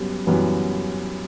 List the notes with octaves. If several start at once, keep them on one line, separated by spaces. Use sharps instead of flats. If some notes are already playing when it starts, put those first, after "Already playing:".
Already playing: F#2 G3 B3
F#2 E3 G3 B3